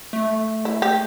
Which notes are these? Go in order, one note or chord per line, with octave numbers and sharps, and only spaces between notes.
A3
E4
G4